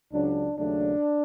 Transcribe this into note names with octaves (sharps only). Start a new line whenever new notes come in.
C#2 C#3 F#3 D4
D#2 C#3 F#3 A3 D4